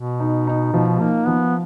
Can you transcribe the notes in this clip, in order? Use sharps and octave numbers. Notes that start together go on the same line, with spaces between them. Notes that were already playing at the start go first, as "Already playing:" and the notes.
Already playing: B2
D#4
D#4
B2 F3
A#3 D#4
F3 B3